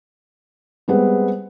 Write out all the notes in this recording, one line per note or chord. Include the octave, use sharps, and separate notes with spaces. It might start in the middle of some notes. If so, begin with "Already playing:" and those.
G3 G#3 B3 C4